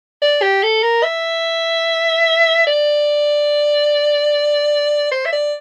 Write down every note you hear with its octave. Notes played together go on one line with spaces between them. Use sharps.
D5
G4
A4
A#4
E5
D5
C5
E5
D5